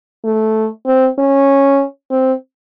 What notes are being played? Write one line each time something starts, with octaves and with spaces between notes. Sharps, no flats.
A3
C4
C#4
C4